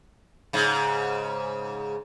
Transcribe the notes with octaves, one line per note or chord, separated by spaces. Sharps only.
G#2 C#3